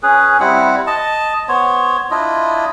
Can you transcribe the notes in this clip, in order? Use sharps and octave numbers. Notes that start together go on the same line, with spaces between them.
C#4 G#4 B4
G3 C4 E4 F#5
D#5 A5
B3 C5 C#5
D4 E4 F4 D#5